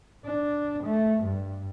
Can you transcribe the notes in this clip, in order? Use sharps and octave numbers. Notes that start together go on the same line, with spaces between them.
D4
A3
G2